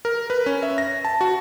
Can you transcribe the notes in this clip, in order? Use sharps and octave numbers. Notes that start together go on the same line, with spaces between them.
A#4
B4
C#4
E5
A#6
A5
F#4